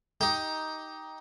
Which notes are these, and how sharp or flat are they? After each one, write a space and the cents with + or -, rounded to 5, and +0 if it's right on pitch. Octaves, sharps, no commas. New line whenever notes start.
D#4 +10 G4 +0